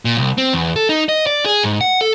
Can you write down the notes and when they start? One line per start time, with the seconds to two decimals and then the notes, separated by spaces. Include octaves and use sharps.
0.05 A#2
0.17 C2
0.38 C4
0.53 E2
0.76 A4
0.89 D#4
1.09 D#5
1.27 D5
1.46 G#4
1.63 G#2
1.81 F#5
2.01 A4